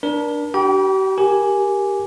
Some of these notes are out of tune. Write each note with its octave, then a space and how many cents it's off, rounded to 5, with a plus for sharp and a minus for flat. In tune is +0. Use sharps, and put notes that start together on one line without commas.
D4 +0 A#4 +35
G4 -40 G5 +0 B5 -45
G4 +0 A#4 +0 G#5 +0